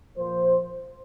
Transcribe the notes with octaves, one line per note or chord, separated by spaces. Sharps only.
A#2 F3 C5